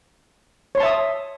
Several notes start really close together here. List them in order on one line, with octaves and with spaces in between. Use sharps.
C#5 C6 A5 E5 D#6